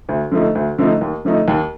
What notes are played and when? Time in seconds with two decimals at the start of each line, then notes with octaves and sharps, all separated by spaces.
0.09 D2
0.31 D3 F3 A3 D#4
0.55 D2
0.78 D3 F3 A3 D#4
1.01 D#2
1.25 D3 F3 A3 D#4
1.48 D#2